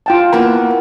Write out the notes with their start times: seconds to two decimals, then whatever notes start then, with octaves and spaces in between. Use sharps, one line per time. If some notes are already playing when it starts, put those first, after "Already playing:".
0.06 F4 G5 A5
0.33 A#3 B3 E4 F#4